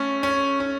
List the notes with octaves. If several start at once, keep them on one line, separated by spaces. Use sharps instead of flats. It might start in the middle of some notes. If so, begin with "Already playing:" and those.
Already playing: A3 C#4
C#4
C#4